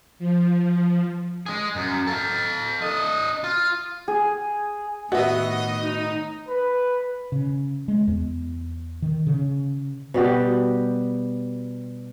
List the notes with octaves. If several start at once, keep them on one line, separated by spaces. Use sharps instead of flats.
F3
G#3 G#4
F#2
A4 F5
D4 D#5
F4
G#4
A2 D#3 B3 F#4 D#5 E5
D#4
B4
C#3
G#3
E2
D#3
C#3
B2 G3 F#4 G4